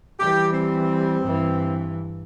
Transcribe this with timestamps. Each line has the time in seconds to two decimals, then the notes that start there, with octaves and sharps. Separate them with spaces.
0.20 E3 G3 G4
0.53 C4
1.22 G2 E3